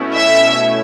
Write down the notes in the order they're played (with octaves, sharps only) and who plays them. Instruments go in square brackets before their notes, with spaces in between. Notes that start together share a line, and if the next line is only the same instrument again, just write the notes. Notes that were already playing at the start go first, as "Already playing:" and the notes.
Already playing: [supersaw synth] B2 A3 C#4 E4
[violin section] E5